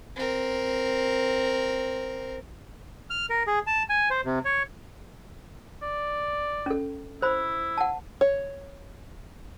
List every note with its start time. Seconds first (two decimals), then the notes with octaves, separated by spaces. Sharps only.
0.16 C4 A#4
3.10 F6
3.30 A#4
3.47 G#4
3.67 A5
3.89 G#5
4.10 C5
4.25 C3
4.45 C#5
5.82 D5
6.66 C#4 A4
7.22 E4 C5 B5
7.78 F#5 A5
8.21 C#5